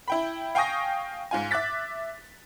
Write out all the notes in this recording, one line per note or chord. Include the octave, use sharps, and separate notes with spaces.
E4 G5 B5
F5 G5 G#5 C#6 D#6 A#6
G#2 F4 G#5
E5 D6 F#6 A6 B6